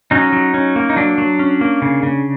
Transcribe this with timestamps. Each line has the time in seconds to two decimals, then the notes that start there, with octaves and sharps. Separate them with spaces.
0.11 F#3 C#4 D#4
0.33 F#3
0.54 C#4
0.76 A#3
0.90 D#4
0.96 F#3 D4
1.18 F#3
1.39 C#4
1.61 A#3
1.82 C#3
2.03 C#3